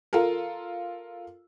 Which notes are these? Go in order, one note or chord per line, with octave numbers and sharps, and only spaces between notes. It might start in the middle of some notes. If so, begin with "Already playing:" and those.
F4 A4 A#4